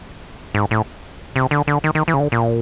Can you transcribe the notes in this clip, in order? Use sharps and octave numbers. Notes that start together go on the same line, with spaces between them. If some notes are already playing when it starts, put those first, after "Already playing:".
G#2
A2
C3
D3
D3
D#3
D#3
E3
C#3
D3
A#2